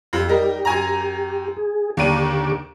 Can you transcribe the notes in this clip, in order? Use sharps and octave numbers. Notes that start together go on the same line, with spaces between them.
F2 G4
G3 D#4 A#4
F#2 G#5 A#5
G#4
D#2 D3 D4 G4 D6 D#7